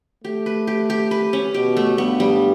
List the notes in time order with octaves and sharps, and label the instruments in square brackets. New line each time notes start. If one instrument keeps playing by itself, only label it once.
[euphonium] A3 [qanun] G4
[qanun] B4
G4
G4
B4
C#4
[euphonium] B2 [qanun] G4
[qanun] A3
[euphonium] G2 [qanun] B3
[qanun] G3